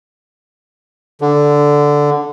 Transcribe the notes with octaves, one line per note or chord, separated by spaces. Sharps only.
D3